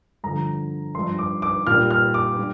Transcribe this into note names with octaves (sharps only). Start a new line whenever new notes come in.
G2 D3 F3 A#5
G2 F3 C6
D6
D6
A#2 G3 F6
F6
D6
G3